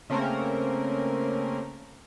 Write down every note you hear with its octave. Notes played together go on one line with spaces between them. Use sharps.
C#3 A3 A#3 C4 C#4 A#4